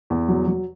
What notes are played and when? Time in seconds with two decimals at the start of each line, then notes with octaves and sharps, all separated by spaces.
0.10 E2
0.29 F#3
0.48 F#3